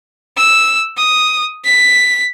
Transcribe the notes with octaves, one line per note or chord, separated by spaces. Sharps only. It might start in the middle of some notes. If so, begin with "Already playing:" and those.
E6
D#6
B6